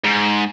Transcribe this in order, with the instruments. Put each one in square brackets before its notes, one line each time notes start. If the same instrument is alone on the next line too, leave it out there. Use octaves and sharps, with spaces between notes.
[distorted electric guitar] G#2